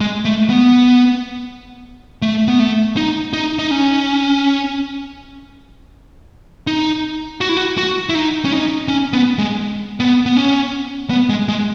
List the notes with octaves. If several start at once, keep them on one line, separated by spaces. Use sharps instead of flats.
G#3
A3
B3
A3
B3
A3
D#4
D#4
D#4
C#4
D#4
F#4
E4
F#4
F#4
E4
D#4
C#4
D#4
C#4
B3
G#3
B3
B3
C#4
B3
G#3
G#3